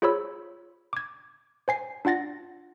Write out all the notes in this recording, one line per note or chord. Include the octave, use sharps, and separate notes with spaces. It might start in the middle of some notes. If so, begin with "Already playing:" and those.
F4 G#4 C5 C#5 B5 E6
D6 G#6
C5 G#5 C7
D4 F4 F#5 A6 A#6